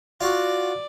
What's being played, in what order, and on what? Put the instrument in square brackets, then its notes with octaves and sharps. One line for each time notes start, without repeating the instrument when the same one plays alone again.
[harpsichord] F4 F#4 [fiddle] D5